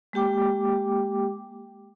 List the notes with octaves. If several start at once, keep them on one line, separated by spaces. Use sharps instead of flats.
G#3 A#3 G4 G5 D6